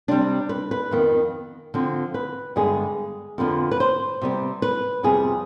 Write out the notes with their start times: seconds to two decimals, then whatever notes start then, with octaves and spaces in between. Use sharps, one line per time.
0.08 C3 G3 C4 D4
0.49 B4
0.71 B4
0.91 F2 D#3 B3
1.74 D3 F3 C4
2.14 B4
2.56 G2 D3 G#3 B3 G#4
3.38 F2 D3 F3 B3
3.71 B4
3.80 C5
4.21 C3 G3 B3
4.62 B4
5.03 F2 C3 G3 B3 G#4